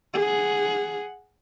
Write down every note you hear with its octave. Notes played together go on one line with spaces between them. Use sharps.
G#4 F#5